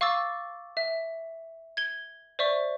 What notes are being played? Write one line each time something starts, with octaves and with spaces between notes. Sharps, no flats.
F5 C#6 D6 E6 A6
E5
G#6 G7
C5 D5 E5 C#6